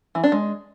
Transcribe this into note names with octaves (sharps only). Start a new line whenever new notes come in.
E3
D4
G#3